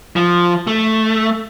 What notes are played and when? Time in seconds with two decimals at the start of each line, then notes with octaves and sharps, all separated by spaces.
0.16 F3
0.67 A3